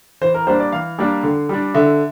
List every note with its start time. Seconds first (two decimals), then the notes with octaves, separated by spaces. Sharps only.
0.21 E3 C5
0.34 A#4
0.47 G3 A#3 D4 C5
0.60 D5
0.72 E3 F5
0.98 G3 A#3 D4
1.23 D3
1.49 G3 D4
1.74 D3 E5